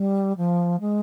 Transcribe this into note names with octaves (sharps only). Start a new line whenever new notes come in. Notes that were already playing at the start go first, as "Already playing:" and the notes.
Already playing: G3
F3
G#3